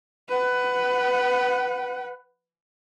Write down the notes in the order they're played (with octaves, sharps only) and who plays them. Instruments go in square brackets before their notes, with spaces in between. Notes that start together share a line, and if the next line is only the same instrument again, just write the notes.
[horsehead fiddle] B4 F#5